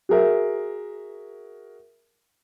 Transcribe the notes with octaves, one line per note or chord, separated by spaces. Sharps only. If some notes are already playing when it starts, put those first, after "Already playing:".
F#4 G#4 A#4 E5